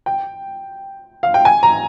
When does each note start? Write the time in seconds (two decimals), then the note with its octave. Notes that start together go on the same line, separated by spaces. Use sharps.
0.06 G5
1.23 F5
1.34 G5
1.45 G#5
1.63 A#5